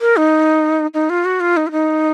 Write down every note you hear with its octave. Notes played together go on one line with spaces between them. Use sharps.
A#4
D#4
D#4
F4
F#4
F4
D#4
F4
D#4